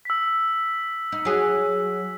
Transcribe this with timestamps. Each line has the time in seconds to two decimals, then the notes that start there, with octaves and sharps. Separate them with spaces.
0.05 E6 B6
1.12 D#4
1.25 F#3 G#4